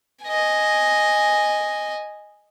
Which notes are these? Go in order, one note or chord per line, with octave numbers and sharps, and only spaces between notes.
D#5 G#5